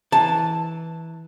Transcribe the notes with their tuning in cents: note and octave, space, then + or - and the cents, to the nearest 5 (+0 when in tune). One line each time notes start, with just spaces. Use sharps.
E3 -10 A5 +0